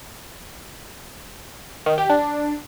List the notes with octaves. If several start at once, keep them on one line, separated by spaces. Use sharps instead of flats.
D#3
G4
D4